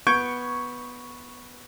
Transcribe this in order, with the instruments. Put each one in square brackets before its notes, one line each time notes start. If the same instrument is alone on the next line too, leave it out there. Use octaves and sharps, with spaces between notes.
[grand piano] B3 C#6 G6 G#6 D7